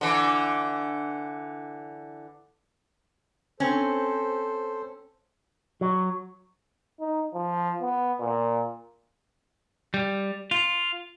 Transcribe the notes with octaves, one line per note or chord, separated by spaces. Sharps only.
D3 E3
C4 C#4 A4 C5
F#3
D#4
F3
B3
A#2
G3
F4